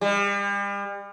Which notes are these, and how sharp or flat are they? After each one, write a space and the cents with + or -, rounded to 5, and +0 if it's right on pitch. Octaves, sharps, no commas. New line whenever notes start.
G3 +40